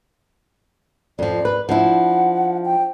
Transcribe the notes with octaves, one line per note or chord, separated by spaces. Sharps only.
F2 F3 D5
B4
F3 D4 E4 F#5
G5